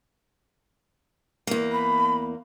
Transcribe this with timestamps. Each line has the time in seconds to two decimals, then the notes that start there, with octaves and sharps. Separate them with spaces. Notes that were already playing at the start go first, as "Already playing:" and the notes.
1.47 E2 A#3
1.72 B5